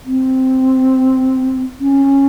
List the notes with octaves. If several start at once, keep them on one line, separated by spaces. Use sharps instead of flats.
C4
C#4